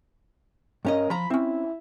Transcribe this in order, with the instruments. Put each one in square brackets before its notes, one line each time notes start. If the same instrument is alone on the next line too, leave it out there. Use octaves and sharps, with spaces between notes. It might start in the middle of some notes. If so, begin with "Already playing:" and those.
[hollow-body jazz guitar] G2 C#4 D#5 [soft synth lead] A#4
[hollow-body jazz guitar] F3 A#5 [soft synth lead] B5
[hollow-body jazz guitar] C4 C#4 [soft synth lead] E4